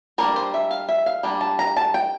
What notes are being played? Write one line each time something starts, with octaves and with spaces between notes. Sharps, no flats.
G3 A#3 D4 A#4
C5
E5
F5
E5
F5
G3 A#3 D4 G5
A5
A#5
A5
G5